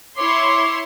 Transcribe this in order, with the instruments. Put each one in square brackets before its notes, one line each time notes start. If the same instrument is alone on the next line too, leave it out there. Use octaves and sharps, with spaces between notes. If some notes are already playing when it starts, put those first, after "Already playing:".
[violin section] E4 C#5 C6 [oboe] D6